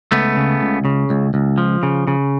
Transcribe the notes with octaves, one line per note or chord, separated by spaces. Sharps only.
C#2 A3 B3
C#3
C#2
C#3
C#2
C#2
F3
C#3
C#3